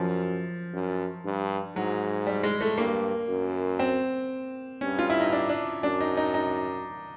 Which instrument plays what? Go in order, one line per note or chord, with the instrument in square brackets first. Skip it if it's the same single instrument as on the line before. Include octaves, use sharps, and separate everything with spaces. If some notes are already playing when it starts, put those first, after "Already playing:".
Already playing: [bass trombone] F#2 [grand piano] F3
[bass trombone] F#2
G2
[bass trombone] G#2 [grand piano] F#3
[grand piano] G3
G#3
A3
[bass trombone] G2 [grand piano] A#3
[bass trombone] F#2
[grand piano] C4
[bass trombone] G2 [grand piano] C#4
[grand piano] F4
E4
D#4
D4
D4
[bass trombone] F#2 [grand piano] D4
[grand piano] D#4
D#4
D#4